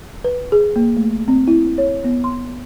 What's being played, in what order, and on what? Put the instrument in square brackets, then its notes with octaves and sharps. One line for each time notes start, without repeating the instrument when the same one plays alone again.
[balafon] B4
G#4
A#3
A3
C4
E4
C#5
B3
C6